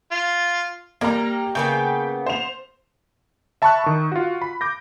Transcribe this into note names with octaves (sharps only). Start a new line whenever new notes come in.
F4
G3 A#3 A#5
C#3 A#3 B3 G5
C5 F7
E5 A5 B5 C#6 E6 F#6
D#3 C#6
F4 F#4
B5
D6 G6 A#6